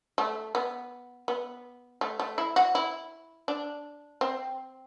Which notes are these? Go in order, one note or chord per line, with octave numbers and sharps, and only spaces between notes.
A3
B3
B3
A3
A3
E4
F#4
E4
D4
C4